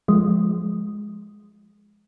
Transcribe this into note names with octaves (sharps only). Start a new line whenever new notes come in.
F3 G#3